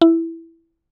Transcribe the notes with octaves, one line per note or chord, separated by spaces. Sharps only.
E4